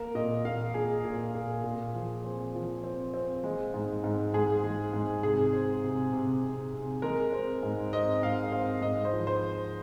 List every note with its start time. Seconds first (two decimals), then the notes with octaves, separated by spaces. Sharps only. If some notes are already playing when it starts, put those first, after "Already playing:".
Already playing: A#3 A#4
0.15 A#2 D#5
0.45 A#2 F5
0.74 A#2 G#4
1.05 A#2
1.35 A#2
1.64 A#2
1.95 F3
2.25 C4
2.55 F3
2.84 C4
3.14 C4
3.44 G#3
3.74 G#2
4.04 G#2
4.34 G#2 G#4
4.63 G#3
4.93 G#2
5.23 C3 G#4
5.53 C4
5.83 C3
6.13 C3
6.43 C3
6.73 C3
7.02 G#3 A#4
7.33 C4
7.63 G#2
7.93 C4 D#5
8.23 G#2 F5
8.52 C4 F5
8.82 G#2 D#5
9.05 C5
9.13 F3
9.27 C5